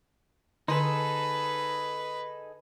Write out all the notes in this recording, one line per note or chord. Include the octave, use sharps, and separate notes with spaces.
D3 D#4 G#4 A4 B4